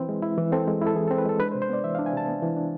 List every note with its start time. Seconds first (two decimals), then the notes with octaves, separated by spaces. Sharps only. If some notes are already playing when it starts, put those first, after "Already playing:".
Already playing: E3 C4 E4 B4
0.09 G#3
0.22 E4
0.37 E3
0.52 C4 A4
0.67 G#3
0.82 E4
0.87 A4
0.95 E3 G#4
1.07 A4
1.11 C4
1.18 B4
1.25 G#3 A4
1.40 D4 B4
1.52 C5
1.55 C3
1.62 C5
1.69 B3 D5
1.84 E3 E5
1.95 F5
1.99 D4
2.06 G#5
2.13 C3 A5
2.28 B3
2.42 E3
2.57 D4